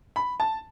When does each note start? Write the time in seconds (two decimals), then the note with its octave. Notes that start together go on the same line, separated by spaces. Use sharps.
0.16 B5
0.40 A5